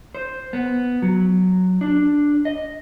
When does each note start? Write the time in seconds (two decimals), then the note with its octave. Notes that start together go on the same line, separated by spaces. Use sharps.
0.15 C5
0.53 B3
1.02 F#3
1.81 D4
2.45 D#5